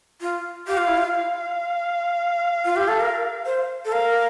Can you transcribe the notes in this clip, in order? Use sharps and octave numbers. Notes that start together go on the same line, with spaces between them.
F4
G4 F5
F4
E4
F4
F5
F4
G4
A4
A#4
C5
A4
A#4 F5